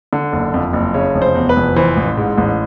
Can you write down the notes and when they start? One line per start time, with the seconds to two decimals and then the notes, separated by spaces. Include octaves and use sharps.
0.13 D3
0.33 F#1
0.54 F2
0.73 F#1
0.94 C#3 C#5
1.15 F1
1.22 C5
1.35 E2
1.49 B4
1.56 F1
1.76 E3 C5
1.97 A1
2.17 G#2
2.38 A1